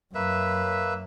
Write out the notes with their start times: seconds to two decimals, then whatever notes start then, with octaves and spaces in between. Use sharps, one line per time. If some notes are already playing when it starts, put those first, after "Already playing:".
0.15 F#2 A#3 B4 E5